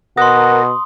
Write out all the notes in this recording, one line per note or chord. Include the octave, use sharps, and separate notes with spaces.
B2 A#4 F#5 A#5 C6 D#6